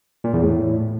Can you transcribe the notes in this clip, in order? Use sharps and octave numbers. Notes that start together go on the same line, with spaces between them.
A#2
E2
A2